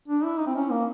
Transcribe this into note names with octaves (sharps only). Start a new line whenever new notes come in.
D4
E4
D#4
C4
C#4
A#3